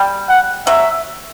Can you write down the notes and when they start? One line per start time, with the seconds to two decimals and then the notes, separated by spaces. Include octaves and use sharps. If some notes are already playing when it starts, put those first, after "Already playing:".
Already playing: G3
0.29 F#5
0.67 F#3 E5